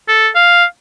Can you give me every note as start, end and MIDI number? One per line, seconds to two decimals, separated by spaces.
0.08 0.29 69
0.35 0.65 77